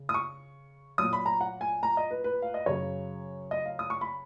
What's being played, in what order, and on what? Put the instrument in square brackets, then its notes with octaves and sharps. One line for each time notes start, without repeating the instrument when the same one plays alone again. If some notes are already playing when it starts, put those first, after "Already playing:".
Already playing: [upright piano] C#3
D#6
C#6
A#2 F#3 D#6
B5
A#5
F#5
G#5
A#5
D#5
B4
B4
F5
D#5
F#2 C#3 F#3 C#5
D#5
F5
D#6
C#6
B5